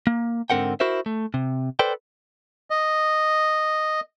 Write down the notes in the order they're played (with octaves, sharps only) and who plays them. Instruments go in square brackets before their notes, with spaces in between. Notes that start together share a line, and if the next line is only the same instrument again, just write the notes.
[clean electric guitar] A#3
G#2 D3 C4 A#4 F#5 G5
E4 F#4 A#4 C5 E5
A3
C3
A4 B4 C5 D5 G5
[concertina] D#5